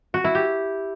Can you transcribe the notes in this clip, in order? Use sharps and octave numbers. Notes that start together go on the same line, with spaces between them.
F#4
E4
G4